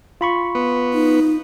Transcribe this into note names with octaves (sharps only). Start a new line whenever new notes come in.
F4 B5 C#6
B3
D#4